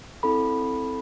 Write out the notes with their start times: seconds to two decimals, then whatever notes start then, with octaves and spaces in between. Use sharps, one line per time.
0.23 C4 E4 A4 B5